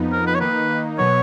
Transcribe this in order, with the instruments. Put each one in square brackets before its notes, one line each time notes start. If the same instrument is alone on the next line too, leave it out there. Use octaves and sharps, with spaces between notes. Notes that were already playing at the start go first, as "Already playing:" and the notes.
Already playing: [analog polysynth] F2 F3 B3 D#4
[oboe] A#4
B4
C#5
[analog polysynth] D#3 A#3 D#4 [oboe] B4
[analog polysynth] B2 F#3 B3 [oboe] C#5